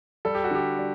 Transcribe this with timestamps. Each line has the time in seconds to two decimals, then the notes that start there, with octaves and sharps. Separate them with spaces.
0.25 G3 A4
0.35 G4
0.44 F#4
0.51 D3 G4
0.79 G3